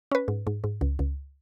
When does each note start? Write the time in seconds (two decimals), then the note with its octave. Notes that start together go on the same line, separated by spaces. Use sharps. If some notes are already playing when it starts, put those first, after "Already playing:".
0.11 C#4 B4
0.28 G#2
0.47 G#2
0.64 G#2
0.81 C#2
0.99 C#2